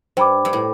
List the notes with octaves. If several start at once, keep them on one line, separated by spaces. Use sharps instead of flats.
G2 C5 G5 B5 D6
G2
A2